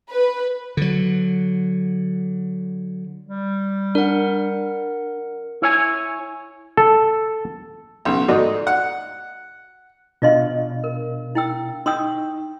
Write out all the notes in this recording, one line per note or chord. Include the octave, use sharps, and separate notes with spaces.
B4
D3 F#3
G3
D4 A#4 F#5
E4 C#5 G#5
A4
B1 C#3
G#2 A3 F#4 D5 D#5
F#5
B2 D4 F4 D#5 F5 C6
A#4
E4 G5 E6
D#4 G5 C6 D#6 E6